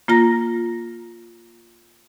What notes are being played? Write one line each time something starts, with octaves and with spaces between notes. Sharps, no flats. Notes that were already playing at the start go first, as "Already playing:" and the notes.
A#3 F4 A#5 A#6